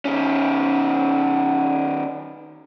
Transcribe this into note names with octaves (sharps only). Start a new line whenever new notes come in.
D#3 C#4